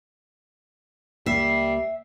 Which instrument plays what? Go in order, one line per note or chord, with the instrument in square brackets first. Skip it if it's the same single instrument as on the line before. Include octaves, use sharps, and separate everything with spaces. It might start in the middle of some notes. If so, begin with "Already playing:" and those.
[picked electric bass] C#2 A#3 [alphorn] G3 [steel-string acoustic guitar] E5 [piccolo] C7